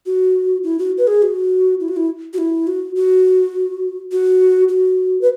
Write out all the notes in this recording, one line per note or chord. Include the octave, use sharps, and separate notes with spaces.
F#4
E4
F#4
B4
G#4
F#4
E4
F#4
E4
F#4
E4
F#4
F#4
F#4
F#4
B4